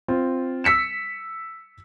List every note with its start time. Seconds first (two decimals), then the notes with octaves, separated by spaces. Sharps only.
0.08 C4 F4
0.64 E6 B6 C#7 E7